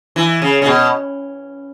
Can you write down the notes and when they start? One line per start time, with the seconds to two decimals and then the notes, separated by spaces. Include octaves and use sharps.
0.16 E3
0.42 C#3
0.62 C#3
0.66 B2